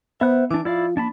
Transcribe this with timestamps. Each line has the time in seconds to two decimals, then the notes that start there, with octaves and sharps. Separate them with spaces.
0.21 B3 C5 E5 F#5 F#6
0.51 E3 D4 E4 D6
0.65 F3 E4 F4 D5 F5
0.97 A#3 D4 A5 B5